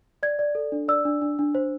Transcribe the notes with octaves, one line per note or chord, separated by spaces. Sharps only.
D5 G#6
D5
A4
D4
D5 E6
D4
D4
D4
C5